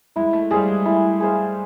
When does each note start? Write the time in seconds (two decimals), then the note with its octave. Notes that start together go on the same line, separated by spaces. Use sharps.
0.16 G#3 E4
0.33 A3
0.51 G3 G#4 C5 F5
0.68 G#3
0.85 A3 E4
1.20 G#4 C5 F5